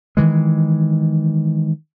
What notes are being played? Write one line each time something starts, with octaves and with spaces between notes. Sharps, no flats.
D#3 E3 G#3